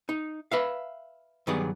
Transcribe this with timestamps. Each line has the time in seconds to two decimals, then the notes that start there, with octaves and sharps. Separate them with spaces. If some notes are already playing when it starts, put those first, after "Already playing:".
0.09 D#4
0.51 B4 E5 F5
1.47 G2 D#3 F#3 B3 G#4 D5